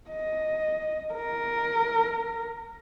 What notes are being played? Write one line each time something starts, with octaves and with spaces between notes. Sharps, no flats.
D#5
A#4